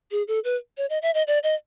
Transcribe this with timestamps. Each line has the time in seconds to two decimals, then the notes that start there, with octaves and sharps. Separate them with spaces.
0.11 G#4
0.28 A4
0.44 B4
0.77 C#5
0.90 D#5
1.02 E5
1.14 D#5
1.27 D5
1.43 D#5